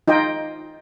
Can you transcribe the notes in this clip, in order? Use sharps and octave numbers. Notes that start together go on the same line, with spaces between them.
D#4 F4 D#5 G5